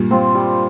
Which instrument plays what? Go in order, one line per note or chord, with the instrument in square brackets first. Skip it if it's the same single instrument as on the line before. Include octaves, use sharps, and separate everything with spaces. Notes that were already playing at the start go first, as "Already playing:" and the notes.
Already playing: [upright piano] G2 A#2
[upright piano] G2 [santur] C4 F4
[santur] G3